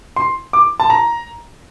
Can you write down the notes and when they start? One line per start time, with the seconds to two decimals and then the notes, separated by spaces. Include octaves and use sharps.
0.16 C6
0.53 D6
0.80 A5
0.90 A#5